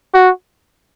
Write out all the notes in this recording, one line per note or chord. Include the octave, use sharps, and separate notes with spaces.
F#4